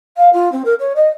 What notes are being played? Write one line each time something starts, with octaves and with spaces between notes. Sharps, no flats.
F5
F4
C4
A#4
C#5
D#5